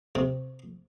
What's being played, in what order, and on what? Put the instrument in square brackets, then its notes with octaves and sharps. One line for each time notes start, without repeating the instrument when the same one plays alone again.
[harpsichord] C3